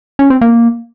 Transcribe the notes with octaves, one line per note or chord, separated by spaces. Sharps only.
C#4
C4
A#3